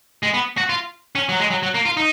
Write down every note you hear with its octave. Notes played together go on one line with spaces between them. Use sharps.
G#3
B3
F#4
F4
C#4
F#3
G#3
F#3
F#3
A#3
F4
D#4